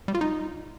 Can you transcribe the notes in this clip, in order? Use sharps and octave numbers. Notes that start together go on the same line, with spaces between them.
G3
F4
D#4